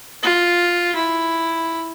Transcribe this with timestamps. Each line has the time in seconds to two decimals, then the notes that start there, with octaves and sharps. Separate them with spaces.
0.22 F4
0.95 E4